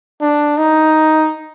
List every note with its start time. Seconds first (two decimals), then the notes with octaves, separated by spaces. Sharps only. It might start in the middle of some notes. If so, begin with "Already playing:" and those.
0.21 D4
0.57 D#4